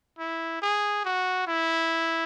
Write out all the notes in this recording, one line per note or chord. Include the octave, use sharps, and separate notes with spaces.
E4
G#4
F#4
E4